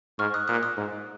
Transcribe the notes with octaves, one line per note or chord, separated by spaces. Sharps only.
G#2 C#6 F6
D#6 F#6
A#2 D#6 F#6
D#6 F#6
G#2